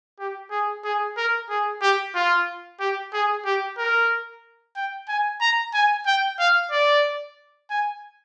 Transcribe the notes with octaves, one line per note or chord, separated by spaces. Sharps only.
G4
G#4
G#4
A#4
G#4
G4
F4
G4
G#4
G4
A#4
G5
G#5
A#5
G#5
G5
F5
D5
G#5